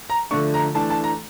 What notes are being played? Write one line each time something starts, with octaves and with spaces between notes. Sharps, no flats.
A#5
D3 F3 A3 D4 C#6
A#5
E3 A3 D4 A5
A5
A#5